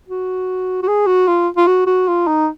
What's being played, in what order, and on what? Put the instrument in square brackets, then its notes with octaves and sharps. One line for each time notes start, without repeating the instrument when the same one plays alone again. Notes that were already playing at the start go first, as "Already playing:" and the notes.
[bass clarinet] F#4
F#4
G#4
F#4
F4
F4
F#4
F#4
F4
D#4